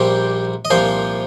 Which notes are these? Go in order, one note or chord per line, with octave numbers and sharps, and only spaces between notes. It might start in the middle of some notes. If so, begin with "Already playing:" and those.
Already playing: A#1 A#2 G3 C4 G4 C5
D#5
C2 A#2 F3 C5 F5